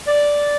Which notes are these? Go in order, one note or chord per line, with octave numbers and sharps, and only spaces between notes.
D5